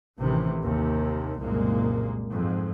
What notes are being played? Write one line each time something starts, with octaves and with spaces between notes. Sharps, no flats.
A1 A2 C3 D#3 E3
D#2 C3 D#3
F#1 C2 A#2 G#3 A#3
F2 G#2